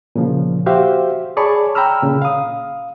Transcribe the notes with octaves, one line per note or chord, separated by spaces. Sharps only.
A#2 C#3 F3
F#4 G4 C5 E5 F5
G#4 C#5 D5 A5 B5 C#6
G5 A#5 B5 E6 F6
A#2 C#3
F5 D#6